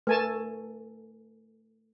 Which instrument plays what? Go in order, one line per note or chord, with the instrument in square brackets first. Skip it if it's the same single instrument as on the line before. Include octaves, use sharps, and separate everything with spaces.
[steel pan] A3 G#5 A5 [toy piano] A#4 B4